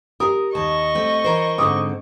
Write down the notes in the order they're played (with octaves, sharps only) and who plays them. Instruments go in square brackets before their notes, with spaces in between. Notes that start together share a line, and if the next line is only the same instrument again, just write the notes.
[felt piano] G4 D#6 [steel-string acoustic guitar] A#4
[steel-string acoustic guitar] D#2 A5 [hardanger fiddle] D#5 C#6
[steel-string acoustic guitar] A3 C4
E3 A#4 C5
[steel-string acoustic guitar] G#2 D3 C4 [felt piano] D6 D#6